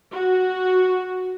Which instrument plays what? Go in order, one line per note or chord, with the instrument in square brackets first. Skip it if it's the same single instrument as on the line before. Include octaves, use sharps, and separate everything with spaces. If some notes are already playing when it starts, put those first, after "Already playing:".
[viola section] F#4